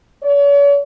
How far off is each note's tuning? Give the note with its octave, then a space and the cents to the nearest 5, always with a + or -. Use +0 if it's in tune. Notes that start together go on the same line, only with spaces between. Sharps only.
C#5 +45